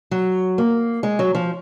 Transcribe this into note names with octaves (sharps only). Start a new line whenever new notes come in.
F#3
A#3
G#3
F#3
F3